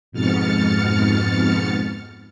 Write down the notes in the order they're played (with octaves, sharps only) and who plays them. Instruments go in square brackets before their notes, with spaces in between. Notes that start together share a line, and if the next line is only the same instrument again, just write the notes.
[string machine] F2 G#2 B2 F6 A6 C#7